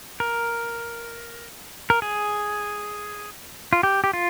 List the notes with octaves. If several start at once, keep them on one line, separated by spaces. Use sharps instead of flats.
A#4
A#4
G#4
F4
G4
G4
F4